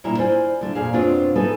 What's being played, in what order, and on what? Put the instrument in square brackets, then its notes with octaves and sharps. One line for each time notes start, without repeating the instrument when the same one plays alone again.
[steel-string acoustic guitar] D2 A#2 G3 E4 E5 A#5
E4 F4 C5 D5 G#5
D3 A3
F2 A#2 A#3 G#4 F5
F2 B2 C4 D4 F4 C#5
A3 B3 D#4 G#4 A4 B4